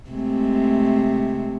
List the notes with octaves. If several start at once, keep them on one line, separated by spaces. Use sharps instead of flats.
C3 G#3 A3